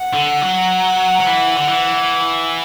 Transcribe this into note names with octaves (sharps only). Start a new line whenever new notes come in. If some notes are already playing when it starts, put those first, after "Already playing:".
Already playing: F#5
D3
F#3
F#3
E3
D3
E3